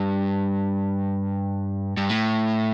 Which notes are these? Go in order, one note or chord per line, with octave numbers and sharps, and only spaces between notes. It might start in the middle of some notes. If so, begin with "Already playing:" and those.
Already playing: G2
G2
A2